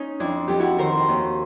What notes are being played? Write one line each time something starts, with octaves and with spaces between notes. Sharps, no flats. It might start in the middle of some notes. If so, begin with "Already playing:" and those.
Already playing: C#4 D#4
F2 D4 E4
F2 G4
E4 F#4
D#3 A#4 C5
D#2